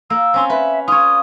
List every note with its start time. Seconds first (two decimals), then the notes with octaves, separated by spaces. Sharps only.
0.10 A#3 E6
0.34 C4 C#4 C6
0.50 B4 E5
0.88 F4 C#5 D#6